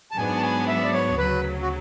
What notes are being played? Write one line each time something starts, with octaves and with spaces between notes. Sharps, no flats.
A5
G#2 F#3 B3 D4 F#4 G#5
A5
G#5
E5
D5
C#5
D2 C#3 F#3 B4
F#4